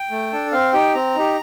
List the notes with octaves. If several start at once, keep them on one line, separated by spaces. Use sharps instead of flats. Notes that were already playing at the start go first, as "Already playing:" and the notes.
Already playing: G5
A3
D4 A4
C4 F5
D#4 G4 G5
C4 A#5
D#4 G4